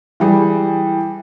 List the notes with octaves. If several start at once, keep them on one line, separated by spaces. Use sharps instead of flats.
E3 G3 G#4